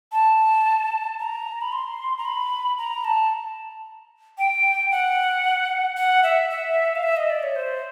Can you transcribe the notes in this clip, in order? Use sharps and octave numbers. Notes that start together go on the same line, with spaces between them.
A5
A#5
B5
C6
A#5
B5
A#5
A5
G5
F#5
F#5
E5
E5
F5
E5
D#5
D5
C#5
C5